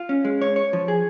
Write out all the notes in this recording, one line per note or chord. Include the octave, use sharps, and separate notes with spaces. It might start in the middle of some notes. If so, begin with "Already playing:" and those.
Already playing: F4
C#4
G#3
C#5
C#5
F3
G#4